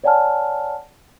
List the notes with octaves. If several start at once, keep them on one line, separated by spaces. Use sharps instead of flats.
C#5 D5 F#5 G#5 A5 F6